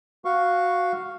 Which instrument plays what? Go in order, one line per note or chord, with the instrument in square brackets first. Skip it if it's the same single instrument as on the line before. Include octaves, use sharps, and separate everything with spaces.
[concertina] F#4 F5 C#6